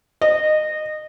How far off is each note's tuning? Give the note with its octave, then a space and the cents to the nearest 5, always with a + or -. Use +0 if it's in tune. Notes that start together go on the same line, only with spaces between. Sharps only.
D#5 -20